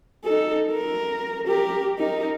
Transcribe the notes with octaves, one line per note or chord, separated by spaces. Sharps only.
D#4 A4
A#4
G4 A#4
D#4 A#4